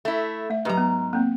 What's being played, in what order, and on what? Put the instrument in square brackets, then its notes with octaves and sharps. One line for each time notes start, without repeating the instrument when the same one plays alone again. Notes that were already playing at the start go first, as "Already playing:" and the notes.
[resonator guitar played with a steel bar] A3 E4
[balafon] A3 E5
[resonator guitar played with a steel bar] G#2 A#5 [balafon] F#3 G4 B4
[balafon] B3
A#3 C4